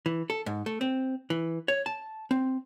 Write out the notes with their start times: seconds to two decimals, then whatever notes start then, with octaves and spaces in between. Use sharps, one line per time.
0.06 E3
0.30 A4
0.46 G#2
0.66 A3
0.81 C4
1.30 E3
1.68 C#5
1.86 A5
2.31 C4